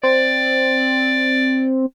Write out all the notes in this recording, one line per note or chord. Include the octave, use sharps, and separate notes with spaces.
C4 D5